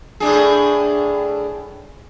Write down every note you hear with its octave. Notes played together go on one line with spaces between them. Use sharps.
A2 D4 G#4